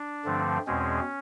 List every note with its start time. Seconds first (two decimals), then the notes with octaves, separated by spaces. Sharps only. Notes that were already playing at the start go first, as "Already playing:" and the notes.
Already playing: D4
0.24 G2 D3 F3 A3 C4
0.67 E2 B2 G#3 C4 C#4